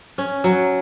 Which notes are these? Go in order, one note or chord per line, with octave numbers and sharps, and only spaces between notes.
C#4
F#3